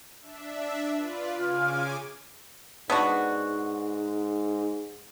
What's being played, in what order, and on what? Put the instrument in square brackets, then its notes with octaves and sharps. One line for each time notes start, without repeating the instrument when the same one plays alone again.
[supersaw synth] D4 E5
F4 B4 D5
[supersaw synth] C#3 G#5 D6 [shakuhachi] F4
[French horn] G#2 [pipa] B3 D4 F#4